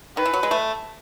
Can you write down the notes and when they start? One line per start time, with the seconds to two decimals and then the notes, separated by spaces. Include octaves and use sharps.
0.17 D#3 B4
0.25 E3
0.33 F#3
0.43 G#3
0.51 A3